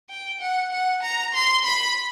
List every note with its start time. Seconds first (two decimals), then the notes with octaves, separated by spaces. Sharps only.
0.10 G5
0.41 F#5
0.72 F#5
1.03 A#5
1.34 C6
1.64 B5